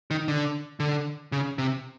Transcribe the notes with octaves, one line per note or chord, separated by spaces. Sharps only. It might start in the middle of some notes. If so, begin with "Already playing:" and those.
D#3
D3
D3
C#3
C3